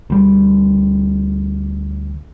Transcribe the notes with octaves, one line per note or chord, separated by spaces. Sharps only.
D2 G3